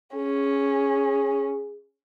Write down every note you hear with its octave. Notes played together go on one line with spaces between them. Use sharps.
C#4 G#4